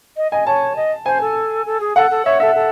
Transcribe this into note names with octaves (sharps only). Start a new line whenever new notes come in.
D#5
D#5 G#5
C#5 A5
D#5
C5 G#5
A4
A4
G#4
A4 F#5
A4
C#5 E5
A4 E5
A4